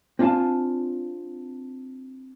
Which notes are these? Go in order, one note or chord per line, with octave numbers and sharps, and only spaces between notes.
C4 D4 F4 F5 G#5 A5